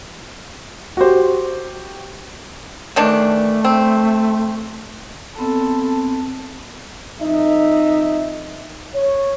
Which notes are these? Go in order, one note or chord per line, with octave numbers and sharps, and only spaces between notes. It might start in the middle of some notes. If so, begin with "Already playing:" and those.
F#4 G4 C5
D#3 E3 A3 D4
C4
B3 C4 A4
F2 D#4 E5
C#5